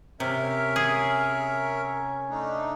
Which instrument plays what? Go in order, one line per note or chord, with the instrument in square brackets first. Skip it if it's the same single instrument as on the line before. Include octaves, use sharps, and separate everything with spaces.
[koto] C3 [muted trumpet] C#4 [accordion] A#4 C#5 E5
[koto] G#4
[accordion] A3 D4 D#4